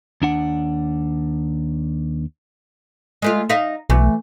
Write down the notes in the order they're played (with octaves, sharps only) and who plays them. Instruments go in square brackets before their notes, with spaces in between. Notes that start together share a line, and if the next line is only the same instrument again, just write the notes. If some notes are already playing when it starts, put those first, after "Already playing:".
[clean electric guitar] D#2 D4 F#5
[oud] G#3 A3 F4
D#4 E5 F5
[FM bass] B1 [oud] E3 A3